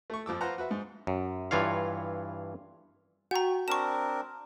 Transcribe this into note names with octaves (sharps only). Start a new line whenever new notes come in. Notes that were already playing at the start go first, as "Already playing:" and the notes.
A3 C#6
F2 F3 D6 E6
F4 B4 C5 F#5 A#5
F#4 B4 E5
G#2
F#2
G2 E3 F4 C#5 F5
F#4 F#5 G5 A#5 C#6
C4 D4 A#4 A5 C#6 F6 E7